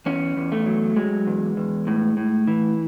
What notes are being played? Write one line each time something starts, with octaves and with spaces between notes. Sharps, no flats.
E2 C#4
E2
A3
F#3
F#3 G#3
E2
E2
A2
A2
E3